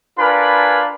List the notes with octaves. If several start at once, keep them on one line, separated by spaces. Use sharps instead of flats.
D4 F4 A#4 B4 G#5 B5